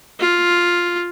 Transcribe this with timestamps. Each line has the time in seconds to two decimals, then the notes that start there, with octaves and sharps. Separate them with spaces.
0.20 F4